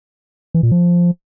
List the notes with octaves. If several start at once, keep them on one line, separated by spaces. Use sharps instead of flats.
E3
A#2
F3